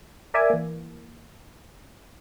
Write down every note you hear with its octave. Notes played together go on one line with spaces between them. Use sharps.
A#4 D5 E5 G#5 D6
E3 A#3